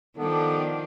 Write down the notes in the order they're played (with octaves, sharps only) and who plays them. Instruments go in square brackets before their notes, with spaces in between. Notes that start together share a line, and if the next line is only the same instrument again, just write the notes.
[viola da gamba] D#3 [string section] F3 D4 G4 [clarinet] B3 [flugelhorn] A4